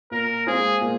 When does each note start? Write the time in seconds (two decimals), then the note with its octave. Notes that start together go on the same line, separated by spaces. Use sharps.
0.11 A#2 A#4
0.47 G#3 C4 F4 G#4 C5
0.81 A#2